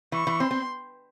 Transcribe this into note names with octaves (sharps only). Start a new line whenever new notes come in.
E3 C#6
E3
C4 C6
C4